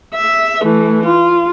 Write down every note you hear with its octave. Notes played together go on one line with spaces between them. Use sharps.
E5
E3 A3
F4